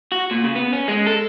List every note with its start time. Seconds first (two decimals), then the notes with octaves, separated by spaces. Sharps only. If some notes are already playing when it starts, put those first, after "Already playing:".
0.12 F#4
0.31 A#2
0.44 C#3
0.55 B3
0.73 C#4
0.88 G#3
1.06 A4